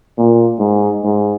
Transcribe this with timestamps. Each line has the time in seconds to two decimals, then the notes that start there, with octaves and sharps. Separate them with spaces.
0.18 A#2
0.60 G#2
1.04 G#2